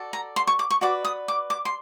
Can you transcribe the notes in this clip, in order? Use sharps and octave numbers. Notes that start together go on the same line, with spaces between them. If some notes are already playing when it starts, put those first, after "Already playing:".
Already playing: F#4 A4 D5
A#5
C6
C#6
D6
C#6
F#4 B4 D5 D6
D#6
D6
D6
C6